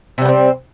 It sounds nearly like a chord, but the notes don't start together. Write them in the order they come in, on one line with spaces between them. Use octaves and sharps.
C3 G3 B3 C4